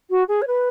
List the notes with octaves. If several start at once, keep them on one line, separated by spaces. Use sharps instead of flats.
F#4
G#4
C#5
B4